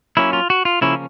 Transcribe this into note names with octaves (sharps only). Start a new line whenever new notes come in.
F#3 A#3 C#4 E4
F4
F#4
F4
C#3 F3 A#3 C#4 E4